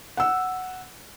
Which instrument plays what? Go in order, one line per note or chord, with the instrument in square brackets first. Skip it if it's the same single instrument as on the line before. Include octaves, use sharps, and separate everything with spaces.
[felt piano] F#5 E6